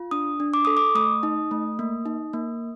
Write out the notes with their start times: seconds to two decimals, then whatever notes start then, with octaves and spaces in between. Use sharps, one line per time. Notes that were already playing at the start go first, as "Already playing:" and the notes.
Already playing: F4
0.11 D4 D#6
0.40 D4
0.54 D6
0.65 A4 D#6
0.77 D6
0.95 A3 D#6
1.23 D#4
1.51 A3
1.79 A#3
2.06 D#4
2.33 A#3